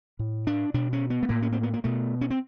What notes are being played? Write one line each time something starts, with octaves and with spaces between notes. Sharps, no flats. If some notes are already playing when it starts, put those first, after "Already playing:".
A2
D4
B2 D4
C#4
B3
A3
A2 A#3
C#4
C4
B3
A#3
B2 A3
C#4
C4